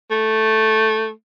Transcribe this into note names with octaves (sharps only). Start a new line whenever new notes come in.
A3